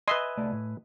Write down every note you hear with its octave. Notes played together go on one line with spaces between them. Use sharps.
B4 D#5 E5 G#5 C6
C2 A3 D5
A2